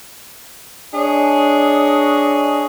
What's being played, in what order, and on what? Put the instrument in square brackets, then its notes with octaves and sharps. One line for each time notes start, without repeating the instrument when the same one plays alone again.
[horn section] D4 G#4 C#5 D#5